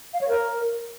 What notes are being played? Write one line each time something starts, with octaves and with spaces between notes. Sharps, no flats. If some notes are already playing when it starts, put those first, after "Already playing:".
F5
C#5
A#4